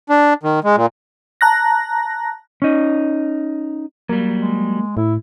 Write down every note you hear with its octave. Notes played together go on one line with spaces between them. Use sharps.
D4
D#3
G#3
A#2
A5 A#5 F#6 A#6
C#4 D#4
F#3 G3 A#3
G#3
A2 E4